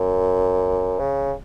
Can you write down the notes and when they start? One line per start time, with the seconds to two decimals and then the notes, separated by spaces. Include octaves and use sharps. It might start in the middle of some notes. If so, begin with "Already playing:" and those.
Already playing: F#2
0.99 C#3